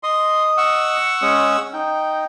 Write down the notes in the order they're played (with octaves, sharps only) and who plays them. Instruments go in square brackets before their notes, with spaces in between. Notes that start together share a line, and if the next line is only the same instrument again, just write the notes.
[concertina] D#5 D#6 [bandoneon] C6
[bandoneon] F#5 C#6 E6
[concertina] G#3 C#4 D#6
D#4 G5